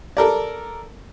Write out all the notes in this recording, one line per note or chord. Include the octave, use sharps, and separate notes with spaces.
A4 A#4 D5